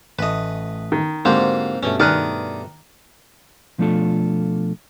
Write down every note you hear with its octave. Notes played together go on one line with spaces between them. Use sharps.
A1 A3 B4 D#5
D#3
G#2 D3 A#3 C4 F#4 G4 C5
G2 B2 A3 C#4
D#3 D5 D#6 F6 F#6
B2 F3 A3 D4 F4 A4